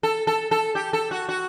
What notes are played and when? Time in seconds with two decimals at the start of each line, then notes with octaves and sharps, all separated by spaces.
0.03 A4
0.27 A4
0.51 A4
0.75 G4
0.93 A4
1.11 F#4
1.29 F#4